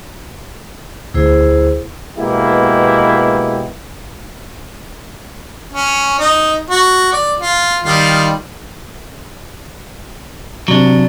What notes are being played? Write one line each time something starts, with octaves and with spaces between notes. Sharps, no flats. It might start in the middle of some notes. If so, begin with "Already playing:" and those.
D2 E4 G#4 C5
B2 G#3 A#3 B3 E4 G4
C#4
D#4
F#4
D5
F4
D#3 G3 F4
C3 F#3 D4